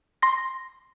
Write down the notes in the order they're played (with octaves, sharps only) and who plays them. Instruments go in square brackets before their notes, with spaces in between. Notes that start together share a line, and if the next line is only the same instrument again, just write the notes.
[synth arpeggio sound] C6 A#6